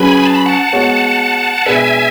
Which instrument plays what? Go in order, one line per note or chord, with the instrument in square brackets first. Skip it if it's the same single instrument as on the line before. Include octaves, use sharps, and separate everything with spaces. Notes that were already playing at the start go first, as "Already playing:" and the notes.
Already playing: [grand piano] F#3 C#4 G#4 B4 [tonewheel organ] G#5 B5
[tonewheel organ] A5
B5
F#5 A5
[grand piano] G#3 B3 F#4 C#5
[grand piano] B2 G#3 D4 G#4 B4 [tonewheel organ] E5 G#5